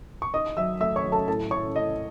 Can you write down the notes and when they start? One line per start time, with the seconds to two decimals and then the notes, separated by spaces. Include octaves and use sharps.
0.22 C#6
0.34 D#4 D#5 D#6
0.57 F#3 E5 E6
0.80 A3 E5 E6
0.96 C#5 C#6
1.04 F#3
1.12 A4 A5
1.28 A2 A4 A5
1.51 A2 C#5 C#6
1.75 A2 D#5 D#6